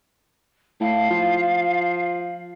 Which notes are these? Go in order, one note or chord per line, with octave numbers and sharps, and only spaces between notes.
A2 F5
F3